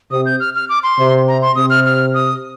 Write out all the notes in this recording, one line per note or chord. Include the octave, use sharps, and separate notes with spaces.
C3 D#6
G6
F6
F6
D6
C6
C3
A#5
C6
C3 D#6
F6
F6
D#6